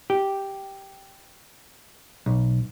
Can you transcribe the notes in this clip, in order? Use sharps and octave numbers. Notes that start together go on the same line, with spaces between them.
G4
B1